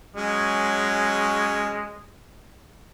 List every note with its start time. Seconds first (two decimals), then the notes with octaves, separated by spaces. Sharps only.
0.16 F#3 G#3 C#4